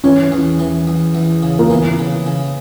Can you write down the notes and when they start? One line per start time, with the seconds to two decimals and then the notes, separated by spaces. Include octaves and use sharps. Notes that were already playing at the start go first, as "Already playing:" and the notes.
0.04 E3 C#4
0.32 E2
0.59 E3
0.87 E2
1.15 E2
1.43 C#3
1.59 A#3
1.70 E3 B3
1.99 C#3
2.26 C#3